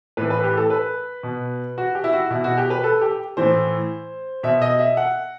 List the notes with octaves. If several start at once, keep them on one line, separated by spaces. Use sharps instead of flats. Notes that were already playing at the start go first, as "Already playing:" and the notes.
A2 E3 B4
B4
G4
A4
B4
B2
F#4
G4
E4
F#4
B2 E4
F#4
G4
B4
A4
G4
A2 E3 C5
B2 E5
D#5
E5
F#5